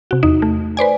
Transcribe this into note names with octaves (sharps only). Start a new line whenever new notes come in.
C3 F#4
E2 D#4
A3
B4 C5 D5 G#5